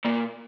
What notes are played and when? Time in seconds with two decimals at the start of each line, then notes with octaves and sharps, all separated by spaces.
0.05 A#2